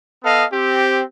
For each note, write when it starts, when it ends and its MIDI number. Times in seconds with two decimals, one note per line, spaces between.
0.24 0.44 59
0.24 0.44 69
0.24 0.44 75
0.24 0.44 77
0.52 1.01 60
0.52 1.01 67